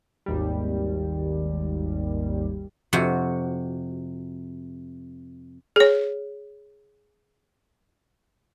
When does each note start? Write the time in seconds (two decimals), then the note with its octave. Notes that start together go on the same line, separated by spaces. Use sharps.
0.26 G#1 D#2 G3
2.93 F2 C3 F#4
5.76 G#4 C#5